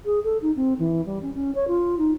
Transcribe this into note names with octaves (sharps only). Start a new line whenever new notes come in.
G#4
A4
D#4
C4
E3
G3
C#4
C#4
C#5
F4
D#4